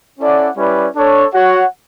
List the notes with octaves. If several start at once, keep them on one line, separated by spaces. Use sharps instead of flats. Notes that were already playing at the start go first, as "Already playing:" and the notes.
C#4 E4 A4 D5 F#5
G3 C#4 E4 B4 D5
D4 A4 C#5
F#4 C#5 F#5